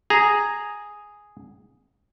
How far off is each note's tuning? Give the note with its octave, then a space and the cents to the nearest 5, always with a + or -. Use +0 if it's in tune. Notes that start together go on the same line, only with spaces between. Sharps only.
G#4 +0 A#5 +0